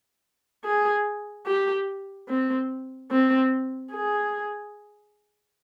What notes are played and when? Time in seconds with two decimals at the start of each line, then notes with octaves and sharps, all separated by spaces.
0.64 G#4
1.46 G4
2.28 C4
3.11 C4
3.92 G#4